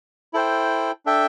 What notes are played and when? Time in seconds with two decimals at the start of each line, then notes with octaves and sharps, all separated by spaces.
0.33 E4 A4 C5 G5
1.06 D4 A4 E5 G5